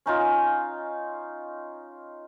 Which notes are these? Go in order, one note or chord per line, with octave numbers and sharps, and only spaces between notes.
C#4 D#4 F4